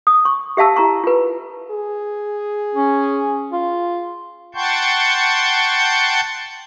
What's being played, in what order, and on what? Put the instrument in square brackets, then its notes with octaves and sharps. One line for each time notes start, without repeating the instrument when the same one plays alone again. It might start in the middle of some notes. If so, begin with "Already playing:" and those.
[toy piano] D#6
C#6
G4 E5 F5 A5 E6
E4 A#5 C#6
F4 B4
[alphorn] G#4
[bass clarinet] C#4
F4
[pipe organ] F#5 G5 A5 C6 C#6 G6